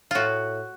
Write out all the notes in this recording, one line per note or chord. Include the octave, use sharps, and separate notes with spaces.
A2 F4 F#4